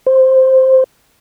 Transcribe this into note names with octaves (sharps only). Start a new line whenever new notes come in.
C5